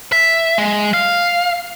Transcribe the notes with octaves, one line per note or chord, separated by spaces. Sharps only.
E5
G#3
F5